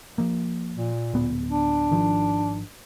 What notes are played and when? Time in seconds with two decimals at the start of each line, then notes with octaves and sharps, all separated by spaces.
0.18 F3 A#3
0.76 A#2
1.14 D1 B3
1.50 D4
1.91 G#1 D#3 F3